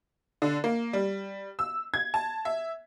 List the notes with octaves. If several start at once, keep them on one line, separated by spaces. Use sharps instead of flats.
D3
A#3
G3
E6
G#6
A5
E5